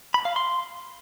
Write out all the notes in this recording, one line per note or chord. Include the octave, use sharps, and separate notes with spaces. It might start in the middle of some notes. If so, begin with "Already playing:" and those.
B5
F5
C6